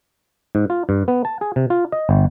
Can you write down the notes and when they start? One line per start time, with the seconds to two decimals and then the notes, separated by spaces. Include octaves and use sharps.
0.55 G#2
0.70 F4
0.89 G2
1.08 B3
1.25 A5
1.41 G#4
1.56 C3
1.70 F4
1.92 D#5
2.09 G1